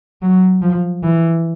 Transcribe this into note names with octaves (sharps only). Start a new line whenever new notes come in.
F#3
F3
E3